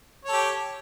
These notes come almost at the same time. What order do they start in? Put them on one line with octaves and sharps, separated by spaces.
C#5 A4 G4